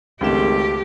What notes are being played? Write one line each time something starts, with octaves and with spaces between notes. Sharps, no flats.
G#1 C#2 A3 G4 E7